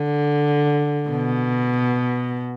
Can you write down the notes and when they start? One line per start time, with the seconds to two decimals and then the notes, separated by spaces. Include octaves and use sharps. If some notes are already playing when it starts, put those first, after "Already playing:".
Already playing: D3
1.09 B2